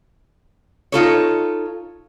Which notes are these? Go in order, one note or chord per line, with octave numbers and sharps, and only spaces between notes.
D#4 F4 A4 C#5